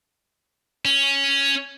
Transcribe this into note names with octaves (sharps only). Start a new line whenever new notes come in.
C#4